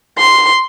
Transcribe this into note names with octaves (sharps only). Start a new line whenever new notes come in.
C6